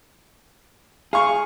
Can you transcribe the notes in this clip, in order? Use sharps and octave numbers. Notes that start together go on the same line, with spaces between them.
G#4 F5 C#6